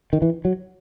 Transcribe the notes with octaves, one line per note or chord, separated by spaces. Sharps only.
D#3
E3
F#3